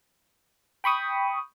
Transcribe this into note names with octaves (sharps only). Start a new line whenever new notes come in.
G5 B5 C#6 D#6